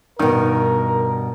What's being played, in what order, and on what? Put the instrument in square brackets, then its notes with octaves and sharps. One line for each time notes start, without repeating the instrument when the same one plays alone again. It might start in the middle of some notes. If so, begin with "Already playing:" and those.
[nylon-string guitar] G2 B2 [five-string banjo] D#3 [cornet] A#4